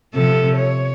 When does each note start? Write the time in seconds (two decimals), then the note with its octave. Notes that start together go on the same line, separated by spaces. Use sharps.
0.14 C3 F3 A4
0.56 C#5